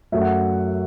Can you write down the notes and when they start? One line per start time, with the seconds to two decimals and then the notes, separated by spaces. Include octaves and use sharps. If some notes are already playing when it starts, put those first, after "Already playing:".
0.12 F#2 F#3 A3 E5
0.21 F#5